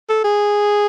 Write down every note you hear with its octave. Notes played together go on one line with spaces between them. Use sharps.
A4
G#4